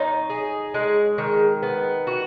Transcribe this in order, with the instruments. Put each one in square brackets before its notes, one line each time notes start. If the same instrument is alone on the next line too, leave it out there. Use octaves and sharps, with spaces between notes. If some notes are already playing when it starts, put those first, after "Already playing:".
Already playing: [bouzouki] D#4 [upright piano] C#5
[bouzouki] G#4
G#3
D#3
B3
F#4